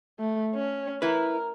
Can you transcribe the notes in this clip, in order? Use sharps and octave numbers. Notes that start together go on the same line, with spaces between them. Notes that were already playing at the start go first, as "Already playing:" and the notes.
A3
C#4
E4 A#4 B4